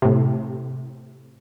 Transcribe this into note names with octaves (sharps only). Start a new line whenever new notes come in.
A2 C3